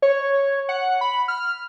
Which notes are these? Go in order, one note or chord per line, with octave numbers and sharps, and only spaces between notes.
C#5
F#5
B5
F6